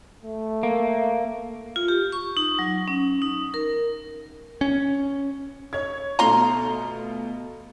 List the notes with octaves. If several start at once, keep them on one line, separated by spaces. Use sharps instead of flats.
A3
A#3
F4
G4
C#6
D#4
F#3
C#4
D#4
A#4
C#4
C#5 G#6
B2 A3 F4 A#5 C6